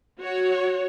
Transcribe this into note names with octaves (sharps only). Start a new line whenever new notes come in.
F#4 C#5